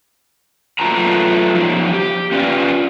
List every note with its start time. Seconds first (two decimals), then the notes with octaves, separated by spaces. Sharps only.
0.79 F#3 A3 F4 B4 A5 A#5
1.55 F3 F#3 G#3 D#4
1.93 G4
2.32 C#4 F4 B4 D5 F#5 G5